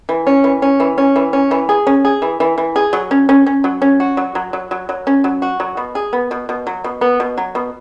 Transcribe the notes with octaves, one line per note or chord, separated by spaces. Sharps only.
E3
C#4
E3
C#4
E3
C#4
E3
C#4
E3
G#4
C#4
G#4
E3
E3
E3
G#4
F#3
C#4
C#4
C#4
F#3
C#4
F#4
F#3
F#3
F#3
F#3
F#3
C#4
F#3
F#4
F#3
B2
G#4
B3
B2
B2
F#3
B2
B3
B2
F#3
B2